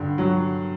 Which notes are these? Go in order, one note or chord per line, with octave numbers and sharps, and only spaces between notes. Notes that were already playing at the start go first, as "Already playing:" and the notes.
Already playing: G2 D3
F#3